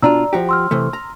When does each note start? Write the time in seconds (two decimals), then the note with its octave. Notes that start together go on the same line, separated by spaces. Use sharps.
0.02 B2 D4 F4 D5 A#5 E6
0.33 F3 F#4 G4
0.49 C6 E6 F6
0.71 C3 E3 A3
0.93 A#5